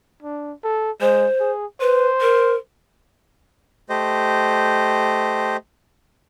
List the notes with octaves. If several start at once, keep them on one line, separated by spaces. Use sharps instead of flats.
D4
A4
G#3 C5
G#4
B4 C5
A#4
A3 G4 C5 D#5